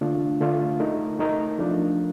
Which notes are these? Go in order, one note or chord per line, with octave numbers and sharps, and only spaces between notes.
D3 A3 D4 F4
D3 A3 D4 F4
A3 D#4 A#4
A3 D#4 A#4
F3 A3 D4 F4